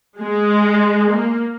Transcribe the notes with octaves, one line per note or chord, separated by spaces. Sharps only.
G#3
A#3